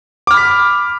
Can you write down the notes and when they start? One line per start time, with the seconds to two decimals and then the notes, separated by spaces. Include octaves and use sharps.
0.27 D6
0.31 F6
0.34 B5
0.37 B6